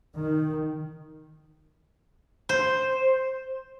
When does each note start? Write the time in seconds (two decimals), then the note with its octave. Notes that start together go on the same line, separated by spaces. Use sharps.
0.15 D#3
2.49 C5